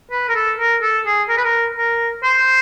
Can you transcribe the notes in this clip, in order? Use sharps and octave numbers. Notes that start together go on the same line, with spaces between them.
B4
A#4
A4
A#4
A4
G#4
A#4
B4
A#4
A#4
C5